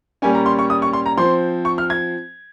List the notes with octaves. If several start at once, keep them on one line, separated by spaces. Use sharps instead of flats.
A#2 G3 A#3 C#4 G#5
A#5
C6
C#6
D#6
C#6
C6
A#5
F3 C4 C6
C#6
F6
G#6